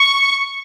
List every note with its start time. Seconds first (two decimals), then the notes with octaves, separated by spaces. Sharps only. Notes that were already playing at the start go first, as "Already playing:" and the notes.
Already playing: C#6